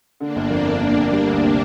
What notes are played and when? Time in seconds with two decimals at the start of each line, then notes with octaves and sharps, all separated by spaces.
0.20 D3 A#3 D4
0.36 G1
0.51 F2
0.66 G1
0.81 D3
0.97 G1
1.12 G3
1.27 D2
1.43 C3